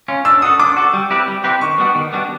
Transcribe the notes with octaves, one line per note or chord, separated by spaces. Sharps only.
C#4 F4
D4 E6
F#4 A4 D#6
D4 D6
F#4 A4
G3
C4 E4 G4 B4
G3
C4 E4 G4 B4
D#3 C#6
G3 B3 D4 F#4
D#3
G3 B3 D4 F#4